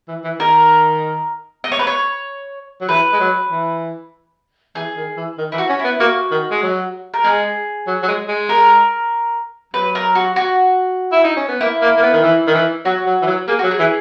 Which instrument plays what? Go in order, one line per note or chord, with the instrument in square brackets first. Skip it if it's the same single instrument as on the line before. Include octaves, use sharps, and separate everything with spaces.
[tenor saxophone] E3
E3
[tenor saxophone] D#3 [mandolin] A#4
[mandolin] D#5
C#5
B4
C#5
[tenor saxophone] F#3
[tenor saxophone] E3 [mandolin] B4
[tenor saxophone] G#3
F#3
E3
[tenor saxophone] E3 [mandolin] G#4
[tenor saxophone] D#3
E3
D#3
[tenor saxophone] E3 [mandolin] E4
[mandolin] F#4
[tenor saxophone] C#4
[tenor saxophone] B3 [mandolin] E4
[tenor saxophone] A#3 [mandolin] F#4
[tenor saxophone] D#3
G#3
F#3
[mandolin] A#4
[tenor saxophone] G#3 [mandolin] G#4
[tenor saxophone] F#3
F#3
G#3
G#3
[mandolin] A#4
[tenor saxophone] F#3 [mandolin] B4
[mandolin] A#4
F#4
F#4
[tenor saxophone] E4
D#4
C#4
B3
[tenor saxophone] A#3 [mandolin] E4
[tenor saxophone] A#3
A#3
B3
D#3
E3
D#3
E3
[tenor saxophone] F#3 [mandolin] F#4
[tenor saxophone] F#3
E3
F#3
[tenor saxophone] A#3 [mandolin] G#4
[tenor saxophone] F#3 [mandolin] F#4
[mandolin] G#4
[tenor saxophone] E3